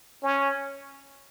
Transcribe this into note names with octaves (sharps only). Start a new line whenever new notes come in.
C#4